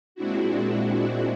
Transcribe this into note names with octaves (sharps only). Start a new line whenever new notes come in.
A#2 G#3 C4 D4 E4 F#4